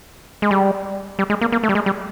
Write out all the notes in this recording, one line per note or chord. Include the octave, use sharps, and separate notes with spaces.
G#3
G3
G3
G#3
A#3
A#3
A3
G3
G#3
G3